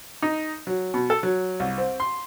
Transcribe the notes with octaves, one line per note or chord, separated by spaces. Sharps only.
D#4
F#3
B2
A4
F#3
C2
C4
C6